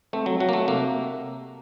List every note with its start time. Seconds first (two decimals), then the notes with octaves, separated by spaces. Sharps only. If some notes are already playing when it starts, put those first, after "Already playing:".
0.13 A3 C4
0.26 F#3
0.40 F#3 F#4
0.49 A#3
0.53 A3
0.67 C3 A#3